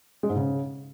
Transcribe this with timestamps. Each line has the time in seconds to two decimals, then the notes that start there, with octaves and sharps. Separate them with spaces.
0.23 G#3
0.29 G#2
0.36 C#3